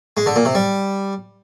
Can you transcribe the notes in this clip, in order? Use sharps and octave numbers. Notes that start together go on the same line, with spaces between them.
G#3
D3
A#2
C3
G3